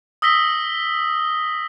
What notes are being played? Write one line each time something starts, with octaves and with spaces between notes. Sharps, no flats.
D#6 E6 A#6 B6 G7